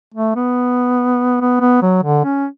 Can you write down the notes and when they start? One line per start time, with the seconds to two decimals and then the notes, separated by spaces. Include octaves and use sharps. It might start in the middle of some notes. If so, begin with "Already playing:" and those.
0.14 A3
0.36 B3
1.41 B3
1.61 B3
1.82 F#3
2.03 D3
2.24 C#4